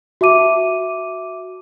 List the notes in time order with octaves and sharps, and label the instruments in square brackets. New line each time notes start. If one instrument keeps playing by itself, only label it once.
[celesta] F#4 E5 A5 D6 D#7